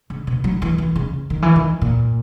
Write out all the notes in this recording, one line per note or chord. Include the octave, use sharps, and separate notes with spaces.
C#3
B2
F#3
E3
E3
C#3
D#3
E3
D#3
A#2